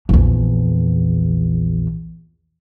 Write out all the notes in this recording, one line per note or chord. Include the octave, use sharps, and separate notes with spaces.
A#1 E2